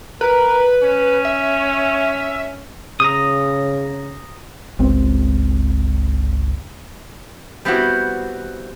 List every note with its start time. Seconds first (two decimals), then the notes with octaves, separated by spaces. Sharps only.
0.21 A#4 B4
0.82 C#4
1.25 E5
3.00 C#3 A#5 D#6
4.79 G1 C#2 C4
7.65 G3 B3 C4 E4 F#4